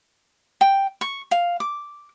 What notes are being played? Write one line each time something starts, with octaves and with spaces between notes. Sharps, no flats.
G5
C#6
F5
D6